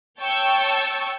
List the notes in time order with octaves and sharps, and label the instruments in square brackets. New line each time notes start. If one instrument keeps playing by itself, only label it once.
[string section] C#5 G5 A5 C#6 E6